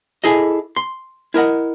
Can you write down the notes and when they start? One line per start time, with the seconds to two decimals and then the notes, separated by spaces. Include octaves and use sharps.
0.24 E4 G#4 A4 D#5
0.76 C6
1.34 E4 A#4 D#5 F#5